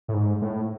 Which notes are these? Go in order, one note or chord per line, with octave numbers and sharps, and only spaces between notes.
A2
G#2
A2